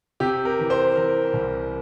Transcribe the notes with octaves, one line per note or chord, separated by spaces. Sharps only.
C3 G4
A#4
E3
C5
E3 A#4
C2